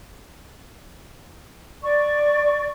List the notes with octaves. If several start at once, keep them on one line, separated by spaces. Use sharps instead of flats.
D5 C#6